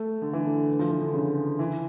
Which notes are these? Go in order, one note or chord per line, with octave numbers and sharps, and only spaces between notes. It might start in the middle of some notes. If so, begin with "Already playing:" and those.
Already playing: A3
D3
E3
D3
F3
E3
D3
C#3
E3